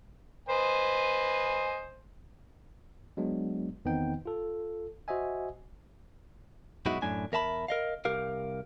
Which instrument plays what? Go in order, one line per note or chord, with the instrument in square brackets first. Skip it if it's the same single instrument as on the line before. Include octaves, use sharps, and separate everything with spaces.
[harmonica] B4 D#5 G#5 [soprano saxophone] C5
[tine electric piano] F#3 G#3 B3 D4
E2 D#3 B3 C4 D#4 G5
F4 A4
F#4 C5 D#5 E5 G#5
[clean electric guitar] F#2 B2 G#3 D#4 E4 F#4
F#2 A2 D4 G#5
E2 A#4 E5 A5 B5
A#4 D#5 F5
C2 G4 A#4 F5